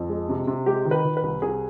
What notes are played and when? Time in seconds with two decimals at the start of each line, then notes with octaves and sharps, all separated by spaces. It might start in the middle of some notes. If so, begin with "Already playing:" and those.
Already playing: F2
0.09 G#3
0.29 C3
0.47 C3
0.66 G#3 G4
0.85 D#3
0.91 B4
1.05 D#3
1.17 B4
1.23 C2
1.42 C2 G#4